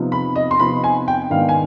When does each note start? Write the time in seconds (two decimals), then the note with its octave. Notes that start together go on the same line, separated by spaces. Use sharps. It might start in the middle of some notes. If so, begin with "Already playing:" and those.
Already playing: C3 F3 B3 D#4
0.12 B5
0.36 D#5
0.51 C6
0.59 C3 F3 B3 D#4 B5
0.84 G#5
1.08 G5
1.30 G#2 D#3 B3 D4 F5
1.49 G#5